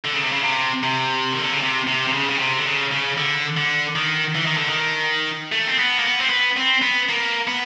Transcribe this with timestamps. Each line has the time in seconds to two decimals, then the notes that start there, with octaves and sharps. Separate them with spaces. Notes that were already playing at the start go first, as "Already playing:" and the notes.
0.05 D3
0.14 C#3
0.23 C3
0.32 C#3
0.43 C3
0.83 C3
1.32 D#3
1.42 D3
1.52 C#3
1.61 C3
1.87 C3
2.08 C3
2.13 C#3
2.30 C#3
2.39 C3
2.59 D3
2.66 C#3
2.92 C#3
3.18 D3
3.57 D3
3.96 D#3
4.35 E3
4.46 D#3
4.57 D3
4.69 D#3
5.52 A3
5.67 C4
5.79 B3
5.98 A#3
6.05 B3
6.21 C4
6.30 B3
6.57 C4
6.82 B3
7.09 A#3
7.48 B3